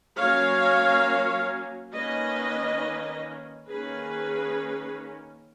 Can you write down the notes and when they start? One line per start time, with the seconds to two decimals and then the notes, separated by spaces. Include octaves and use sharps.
0.17 F#3 A#3 C#4 C#5 F5
1.92 D#3 A#3 C#4 B4 D#5
3.68 D#3 A#3 C#4 G#4 B4